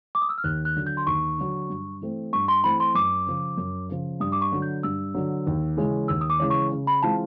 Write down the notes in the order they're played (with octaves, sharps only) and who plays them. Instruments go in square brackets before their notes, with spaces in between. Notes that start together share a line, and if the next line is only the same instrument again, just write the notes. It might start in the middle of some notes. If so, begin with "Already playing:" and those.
[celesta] D6
D#6
E6
F6
[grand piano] D#2 [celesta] F#6
[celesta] F#6
[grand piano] D3 F#3
[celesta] G6
C6
[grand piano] D#2 [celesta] C#6
[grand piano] D3 F#3
G2
E3 A3 C4
[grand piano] G2 [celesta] C#6
[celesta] C6
[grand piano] E3 A3 C4 [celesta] B5
[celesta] C6
[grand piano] F#2 [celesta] D6
[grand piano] C#3 F3
F#2
C#3 F3
[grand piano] G2 [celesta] D#6
[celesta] D6
C#6
[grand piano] D3 F#3
[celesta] G6
[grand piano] G2 [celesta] E6
[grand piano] D3 F#3
D#2
C#3 E3 G#3 C#4
[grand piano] D#2 [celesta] E6
[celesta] D#6
D6
[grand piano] C#3 E3 G#3 C#4
[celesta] C#6
[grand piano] C#3
[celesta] B5
[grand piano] E3 G#3 C4 F4 [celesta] A5